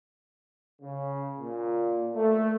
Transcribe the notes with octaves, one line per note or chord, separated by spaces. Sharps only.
C#3
A#2
A3